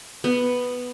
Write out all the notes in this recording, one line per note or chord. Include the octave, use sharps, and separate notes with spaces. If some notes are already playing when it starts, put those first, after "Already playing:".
B3